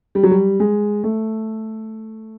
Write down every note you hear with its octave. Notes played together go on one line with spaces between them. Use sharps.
G3
F#3
G3
G#3
A3